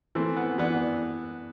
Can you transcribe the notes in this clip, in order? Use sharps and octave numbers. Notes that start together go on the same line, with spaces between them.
E3 A3 C4
B3
E3 B3 D4